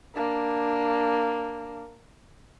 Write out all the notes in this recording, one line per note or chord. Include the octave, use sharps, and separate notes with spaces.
A#3 D4